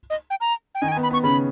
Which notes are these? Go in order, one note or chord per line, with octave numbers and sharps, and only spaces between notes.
D#5
G5
A#5
G5
D#3 D#4 G#5
G5
G#5
B3
B5
B3 C#6
C#3 C#4 B5